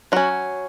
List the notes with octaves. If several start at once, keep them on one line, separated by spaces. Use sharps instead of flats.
F#3 C#4 F#4